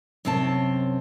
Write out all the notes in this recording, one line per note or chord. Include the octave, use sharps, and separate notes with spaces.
F#2 C3 C4 C#5 A5